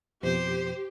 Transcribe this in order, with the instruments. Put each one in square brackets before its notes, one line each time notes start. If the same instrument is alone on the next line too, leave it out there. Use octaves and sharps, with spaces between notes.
[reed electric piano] F2 B2 F3 [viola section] G4 [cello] C5